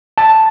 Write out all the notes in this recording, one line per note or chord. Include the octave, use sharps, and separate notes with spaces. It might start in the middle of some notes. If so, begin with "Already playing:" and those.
A5